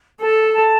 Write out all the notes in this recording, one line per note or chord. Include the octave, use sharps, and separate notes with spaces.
A4 A5
A5